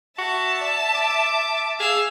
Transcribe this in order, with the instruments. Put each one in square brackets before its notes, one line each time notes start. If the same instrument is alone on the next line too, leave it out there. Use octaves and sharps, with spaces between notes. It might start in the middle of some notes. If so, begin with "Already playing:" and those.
[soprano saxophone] F#4 [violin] E5 A5
[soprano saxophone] D5
D6
[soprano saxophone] G#4 [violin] F5 E6